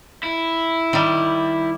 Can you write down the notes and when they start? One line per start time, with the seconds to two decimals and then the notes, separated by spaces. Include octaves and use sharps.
0.24 E4
0.93 D#3 G3